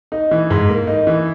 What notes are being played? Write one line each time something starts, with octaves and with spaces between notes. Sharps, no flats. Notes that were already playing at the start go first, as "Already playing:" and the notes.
D#4
E3
G#2
A#3
D#4
E3